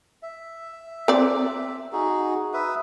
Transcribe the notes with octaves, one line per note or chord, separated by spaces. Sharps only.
E5
C4 D5
D#4 F#4 G#4
B4 E5 D#6